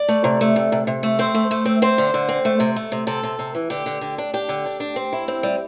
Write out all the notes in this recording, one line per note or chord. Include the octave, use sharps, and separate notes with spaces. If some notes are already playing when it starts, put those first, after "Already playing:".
Already playing: D5
A3
C3
A3
C3
C3
C3
A3
C4 C5
A3
A3
C4
C4 C5
D3
D3
C4
A3
C3
A3
C3
C3 A4
C3
C3
E3
D3 G4
D3
D3
D4
D4 G4
D3
D4
D4
C4
E4
C4
G3